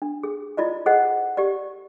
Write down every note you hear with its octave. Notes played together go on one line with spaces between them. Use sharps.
D4
G#4
E4 F4 D5 D#5
G#4 C5 D#5 F#5
G4 D5